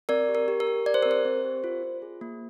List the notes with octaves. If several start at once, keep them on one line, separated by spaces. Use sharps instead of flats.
C4 A#4 D5
G4
A#4
G4
A#4
G4
G4 D5
C5
C4 A#4
C5
C4
G4
F4
F4
G#4
A#3